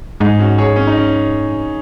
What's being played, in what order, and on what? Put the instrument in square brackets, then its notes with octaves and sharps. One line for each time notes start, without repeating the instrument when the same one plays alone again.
[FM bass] G#2 [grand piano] D#4 G#4
[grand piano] C#4 F#4
G#4 C#5
C#4
D#4
C#4